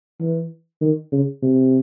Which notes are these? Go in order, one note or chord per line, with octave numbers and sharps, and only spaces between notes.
E3
D#3
C#3
C3